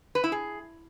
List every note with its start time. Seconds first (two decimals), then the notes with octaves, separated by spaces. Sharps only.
0.15 B4
0.24 E4
0.32 G#4